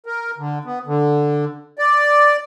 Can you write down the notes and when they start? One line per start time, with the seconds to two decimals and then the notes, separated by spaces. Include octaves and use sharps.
0.06 A#4
0.38 D3
0.65 B3
0.86 D3
1.78 D5